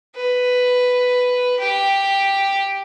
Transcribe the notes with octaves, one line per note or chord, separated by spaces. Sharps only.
B4
G4